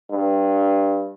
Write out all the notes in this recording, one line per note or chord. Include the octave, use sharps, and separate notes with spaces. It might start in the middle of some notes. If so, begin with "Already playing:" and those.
G2